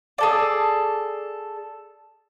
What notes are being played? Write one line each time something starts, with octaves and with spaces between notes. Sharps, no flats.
G#4 A4 D5